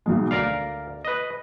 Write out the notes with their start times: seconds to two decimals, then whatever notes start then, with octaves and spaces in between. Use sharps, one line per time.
0.06 B1 F#3 G#3
0.31 D2 A#4 D5 F5
1.05 B4 D#5